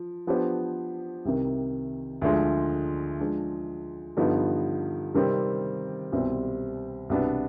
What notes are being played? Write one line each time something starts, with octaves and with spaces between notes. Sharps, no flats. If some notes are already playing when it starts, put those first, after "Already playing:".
Already playing: F3
F3 B3 D4 G4 C5
C2 C3 D#3
D2 D3 F3 G#3
F3 G#3 D4
G2 D3 F3 B3 D#4
C3 D#3 G3 C4
C2 B2 G3 C4
C2 B2 B3 D4